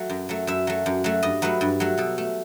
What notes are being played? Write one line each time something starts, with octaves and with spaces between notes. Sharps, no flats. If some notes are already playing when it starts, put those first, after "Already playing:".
Already playing: F#3 A3
F#2
F#3 A3
F#2 E5
F#3 A3
F#2
F#3 A3
G2 D#5
F#3 A3 B4
G2
F#3 A3
B2 A4
A3